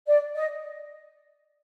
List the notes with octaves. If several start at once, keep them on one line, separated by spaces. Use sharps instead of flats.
D5
D#5